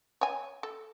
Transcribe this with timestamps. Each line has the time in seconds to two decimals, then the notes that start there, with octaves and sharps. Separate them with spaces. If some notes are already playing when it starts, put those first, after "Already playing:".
0.21 C#5 G#5
0.63 A4